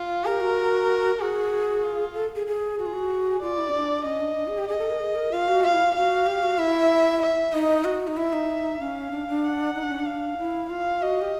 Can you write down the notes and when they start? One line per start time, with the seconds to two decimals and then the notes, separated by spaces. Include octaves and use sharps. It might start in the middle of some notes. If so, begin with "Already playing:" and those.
Already playing: F4
0.25 G4 A#4
0.41 F#4
1.20 F#4 G#4
1.83 F4
2.14 A4
2.36 G#4
2.47 G#4
2.78 F#4 G#4
2.86 F4
2.93 F#4
3.42 F4 D5
3.58 E4
3.69 C#4
3.74 D4
4.05 C#4 D#5
4.21 D4
4.36 D4
4.48 G#4
4.58 G4
4.68 G#4 D#5
4.79 A4
4.90 A#4
5.00 G#4
5.15 A#4
5.32 F4 F5
5.48 F#4
5.63 F4 F5
5.74 E4
5.84 F4
5.96 F#4 F5
6.26 G4
6.43 F#4
6.58 E4 E5
7.22 E5
7.53 D#4 D#5
7.85 F#4
8.07 D#4
8.17 E4 E5
8.33 D#4
8.80 C#4 F5
9.11 D4
9.28 D4
9.44 F#5
9.75 D#4
9.83 D4
9.91 C#4
9.99 D4
10.06 F5
10.38 E4
10.70 F4 F5
11.02 F#4 D#5
11.21 G4